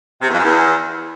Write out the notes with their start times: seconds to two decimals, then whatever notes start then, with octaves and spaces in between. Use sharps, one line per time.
0.22 C3
0.27 E2
0.32 F2
0.38 F#2
0.43 E2